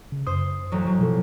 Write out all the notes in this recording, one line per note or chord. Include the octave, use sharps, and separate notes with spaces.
C#3
F#2 C5 D#6
A1 F#3
F#3
B2 F3 A4